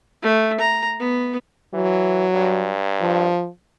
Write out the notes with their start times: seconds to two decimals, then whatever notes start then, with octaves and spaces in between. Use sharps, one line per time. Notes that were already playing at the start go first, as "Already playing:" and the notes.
0.22 A3
0.60 A#5
1.00 B3
1.74 E3 F#3
2.33 G2
3.01 F3